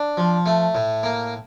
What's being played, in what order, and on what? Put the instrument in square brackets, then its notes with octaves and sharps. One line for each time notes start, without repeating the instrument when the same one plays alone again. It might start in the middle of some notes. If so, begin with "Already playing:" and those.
Already playing: [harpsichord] D4
F3
A3
A2
A#3